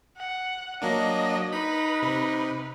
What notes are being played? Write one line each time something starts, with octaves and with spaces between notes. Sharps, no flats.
F#5
F#3 A#3 D4 D#5
D#4 B4 B5
C3